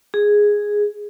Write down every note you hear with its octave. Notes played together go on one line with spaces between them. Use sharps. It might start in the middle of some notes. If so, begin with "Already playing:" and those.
G#4